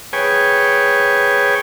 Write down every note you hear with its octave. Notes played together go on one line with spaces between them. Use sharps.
G#4 B4 C#5 G5 G#5